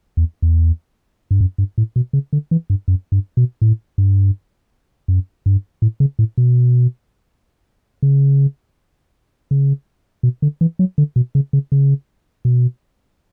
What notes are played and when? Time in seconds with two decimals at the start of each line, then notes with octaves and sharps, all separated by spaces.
0.17 E2
0.42 E2
1.31 G2
1.41 F#2
1.58 G2
1.78 A2
1.96 B2
2.13 C#3
2.33 D3
2.51 E3
2.70 G2
2.88 F#2
3.12 G2
3.37 B2
3.62 A2
3.98 G2
5.08 F#2
5.46 G2
5.82 A2
6.00 C#3
6.19 A2
6.38 B2
8.03 C#3
9.51 C#3
10.23 B2
10.42 D3
10.61 E3
10.79 F#3
10.98 D3
11.16 B2
11.35 C#3
11.53 C#3
11.72 C#3
12.45 B2